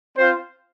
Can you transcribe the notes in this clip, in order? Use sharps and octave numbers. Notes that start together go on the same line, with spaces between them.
C4 F4 C5